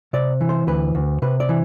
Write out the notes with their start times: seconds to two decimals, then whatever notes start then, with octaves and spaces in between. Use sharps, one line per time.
0.13 C3 D5
0.41 E3
0.49 C5
0.67 D2 B4
0.95 D2
1.22 C3 B4
1.40 D5
1.49 E3